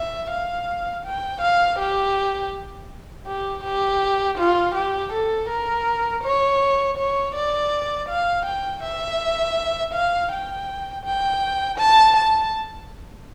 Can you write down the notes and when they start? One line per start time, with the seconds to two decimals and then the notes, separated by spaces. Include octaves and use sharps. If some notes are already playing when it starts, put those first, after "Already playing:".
Already playing: E5
0.30 F5
1.05 G5
1.41 F5
1.79 G4
3.27 G4
3.64 G4
4.38 F4
4.75 G4
5.12 A4
5.49 A#4
6.23 C#5
6.98 C#5
7.35 D5
8.09 F5
8.45 G5
8.83 E5
9.93 F5
10.31 G5
11.05 G5
11.79 A5
12.17 A5